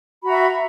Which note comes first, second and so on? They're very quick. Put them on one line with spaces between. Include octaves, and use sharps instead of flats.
B5 F#4 A#5 E5